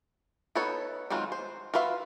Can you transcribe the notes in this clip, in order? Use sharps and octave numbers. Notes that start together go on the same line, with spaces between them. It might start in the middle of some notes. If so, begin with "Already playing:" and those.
B3 D#4 A4 B4 C#5
D#3 F#3 G#3 C4 F4
C5
F4 F#4 B4 E5 F5